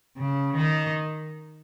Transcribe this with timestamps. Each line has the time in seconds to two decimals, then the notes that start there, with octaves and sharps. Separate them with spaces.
0.18 C#3
0.56 D#3